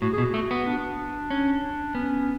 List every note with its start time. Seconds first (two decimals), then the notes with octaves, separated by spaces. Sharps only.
0.02 A2 F#4
0.13 B2 G#4
0.23 F#4
0.34 A3 F#4
0.51 B3
0.67 D4
1.30 C#4
1.95 B3 C#4